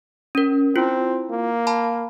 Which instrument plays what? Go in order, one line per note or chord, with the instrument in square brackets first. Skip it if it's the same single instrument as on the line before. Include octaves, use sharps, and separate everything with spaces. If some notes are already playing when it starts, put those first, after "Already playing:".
[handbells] C#4 A#4
[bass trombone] C4 [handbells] E4 F4
[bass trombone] A#3
[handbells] A5 B5